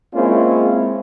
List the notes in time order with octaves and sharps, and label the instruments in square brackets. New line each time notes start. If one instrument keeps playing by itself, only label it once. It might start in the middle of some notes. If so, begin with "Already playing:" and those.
[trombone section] G#3 A#3 C4 C#4 E4 F4